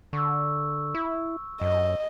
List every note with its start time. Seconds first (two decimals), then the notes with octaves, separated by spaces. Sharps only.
0.13 D3 C#6 E6
0.94 E4
1.61 F#2 D#5